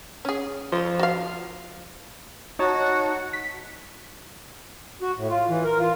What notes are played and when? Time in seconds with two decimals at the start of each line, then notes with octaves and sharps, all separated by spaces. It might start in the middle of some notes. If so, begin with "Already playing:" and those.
0.25 C#4 G#4
0.72 F3
0.99 F#4 F5
2.59 D#4 F#4 C#5 A5
3.33 B6
5.02 F#4
5.17 A2
5.30 F4
5.49 E3
5.64 A#4
5.79 F4